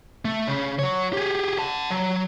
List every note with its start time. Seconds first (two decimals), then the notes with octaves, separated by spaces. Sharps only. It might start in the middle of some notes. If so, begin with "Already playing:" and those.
0.25 A3
0.48 C#3
0.79 F#3 C#5
1.13 G4 G#4
1.59 F#5 A5
1.90 F#3